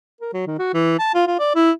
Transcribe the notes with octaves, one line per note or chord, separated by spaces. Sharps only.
A#4
F#3
D#3
F#4
E3
A5
F4
F4
D5
E4